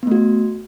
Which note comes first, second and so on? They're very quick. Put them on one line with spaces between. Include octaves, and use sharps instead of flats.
B3 A3 F#4